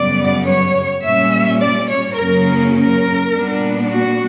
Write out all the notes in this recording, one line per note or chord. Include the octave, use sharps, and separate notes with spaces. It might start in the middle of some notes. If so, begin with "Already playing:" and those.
Already playing: F#2 C#3 G3 B3 D5
C#5
A#2 G3 C#4 E5
D5
C#5
F#2 C#3 F#3 A#3 C#4 A#4
A#4
A#2 G3 B3 D4
F#4